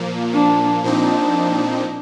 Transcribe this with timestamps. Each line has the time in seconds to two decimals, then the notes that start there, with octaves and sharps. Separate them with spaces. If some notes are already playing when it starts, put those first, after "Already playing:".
Already playing: A#2 F3 A#3
0.33 D4
0.84 A#2 F3 C4 D4 D#4